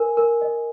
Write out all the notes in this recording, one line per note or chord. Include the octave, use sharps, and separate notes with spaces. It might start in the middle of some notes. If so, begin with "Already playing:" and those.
Already playing: A#4 G#5
A#4
D#5